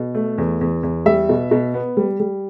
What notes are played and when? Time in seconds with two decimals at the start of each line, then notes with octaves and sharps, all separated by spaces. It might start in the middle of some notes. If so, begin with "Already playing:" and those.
Already playing: B2
0.15 A3
0.38 E2
0.61 E2
0.83 E2
1.06 G3 E5
1.29 B2
1.51 B2
1.74 B3
1.97 G3
2.20 G3